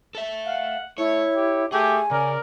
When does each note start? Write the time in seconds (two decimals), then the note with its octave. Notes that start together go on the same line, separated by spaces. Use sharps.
0.15 A4 E5
0.46 F5 F#5
0.98 A3 E4 C#5
1.35 G4
1.72 A3 G4 G#4 G#5
2.11 C#3 A#4 D5